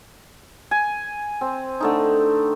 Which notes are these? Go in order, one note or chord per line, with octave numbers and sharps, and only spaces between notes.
G#5
C4
D3 A3 D#4